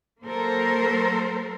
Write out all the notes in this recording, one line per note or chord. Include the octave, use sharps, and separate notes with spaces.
F#3 A#3 A4 A#4 C5